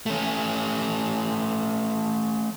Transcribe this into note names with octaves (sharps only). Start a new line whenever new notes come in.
A3 C#4